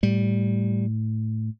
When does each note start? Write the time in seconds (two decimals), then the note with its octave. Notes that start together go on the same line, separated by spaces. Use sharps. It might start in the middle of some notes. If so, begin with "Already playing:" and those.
0.03 A2 G3